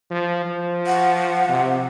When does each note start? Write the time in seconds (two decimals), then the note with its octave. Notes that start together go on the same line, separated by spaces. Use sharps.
0.11 F3
0.45 F3
0.87 F#5
1.49 C3